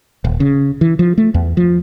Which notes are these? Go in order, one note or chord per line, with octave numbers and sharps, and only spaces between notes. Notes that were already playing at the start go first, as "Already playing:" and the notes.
D#1
C#3
E3
F3
A3
E2
F3